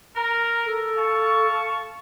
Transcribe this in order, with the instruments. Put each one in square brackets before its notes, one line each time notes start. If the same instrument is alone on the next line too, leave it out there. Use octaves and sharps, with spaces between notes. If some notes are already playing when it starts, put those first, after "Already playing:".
[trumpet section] A#4
[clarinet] A4
[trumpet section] F5 A5 C#6